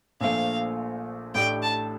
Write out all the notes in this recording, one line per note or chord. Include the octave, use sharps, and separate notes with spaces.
A#1 A#2 F3 A3 F5
A1 A2 A3 D4 G4 G5
A5